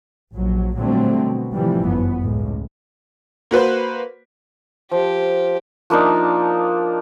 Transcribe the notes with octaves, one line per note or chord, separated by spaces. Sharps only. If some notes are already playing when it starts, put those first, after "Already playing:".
A#1 F#3
A#2 D3 F#3 G3 A3 C4
B2
A2 C3 E3 F3 G3
G1 F#2 B3
C#2 A2
A#3 F#4 B4 C5
F3 G4
F3 A#3 D4 D#4